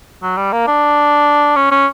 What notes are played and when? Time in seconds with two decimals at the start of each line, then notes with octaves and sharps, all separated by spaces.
0.22 F#3
0.37 G3
0.52 A#3
0.67 D4
1.56 C#4
1.71 C#4